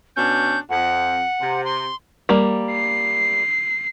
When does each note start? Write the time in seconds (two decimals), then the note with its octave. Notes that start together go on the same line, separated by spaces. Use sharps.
0.16 B2 C#4 D4 G6
0.69 F2 F#5
1.41 C3
1.64 C6
2.29 G3 A#3
2.72 C7